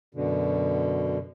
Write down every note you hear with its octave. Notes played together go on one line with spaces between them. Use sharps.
F#2 B2 D3